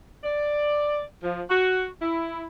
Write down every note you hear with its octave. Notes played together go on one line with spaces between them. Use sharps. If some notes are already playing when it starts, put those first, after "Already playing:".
D5
F3
F#4
E4